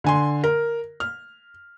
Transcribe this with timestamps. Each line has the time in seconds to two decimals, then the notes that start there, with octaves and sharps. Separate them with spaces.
0.04 D3 G#5 C6
0.44 A#4
1.00 F6